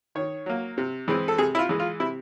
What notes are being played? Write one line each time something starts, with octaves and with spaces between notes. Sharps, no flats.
D#3 C#5
F#3 A#3
C3
E3 G#3 C4
A4
C3 G#4
E4
F4
E3 G#3
F4
C3 E4